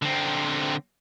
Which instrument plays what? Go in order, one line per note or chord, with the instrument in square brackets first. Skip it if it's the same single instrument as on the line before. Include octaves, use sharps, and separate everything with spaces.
[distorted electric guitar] D3 C4